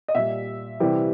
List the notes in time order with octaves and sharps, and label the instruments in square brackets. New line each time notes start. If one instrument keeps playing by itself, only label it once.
[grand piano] D#5
A#2 G3 E5
C3 E3 G3